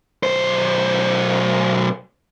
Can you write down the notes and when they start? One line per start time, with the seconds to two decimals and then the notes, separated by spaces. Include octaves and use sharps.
0.23 B1 C5